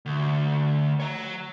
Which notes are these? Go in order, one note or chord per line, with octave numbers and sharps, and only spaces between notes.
D2
C#5 A#5